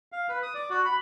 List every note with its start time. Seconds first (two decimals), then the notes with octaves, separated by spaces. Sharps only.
0.12 F5
0.29 B4
0.43 D#6
0.54 D5
0.70 F#4
0.85 B5